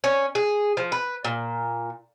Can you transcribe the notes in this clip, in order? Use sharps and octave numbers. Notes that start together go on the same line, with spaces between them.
C#4
G#4
F3
B4
A#2